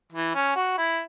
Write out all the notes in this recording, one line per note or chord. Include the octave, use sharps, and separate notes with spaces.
E3
C#4
F#4
E4